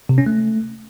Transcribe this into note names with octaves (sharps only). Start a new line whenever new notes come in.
C3
C#4
A3